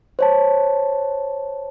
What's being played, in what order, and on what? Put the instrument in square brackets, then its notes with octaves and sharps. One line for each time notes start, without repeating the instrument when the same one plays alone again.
[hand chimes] C5 C#5 A5